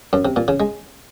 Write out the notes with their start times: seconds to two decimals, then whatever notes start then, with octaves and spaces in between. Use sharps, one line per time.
0.13 F#2
0.25 C3
0.36 A#2
0.48 C#3
0.60 G#3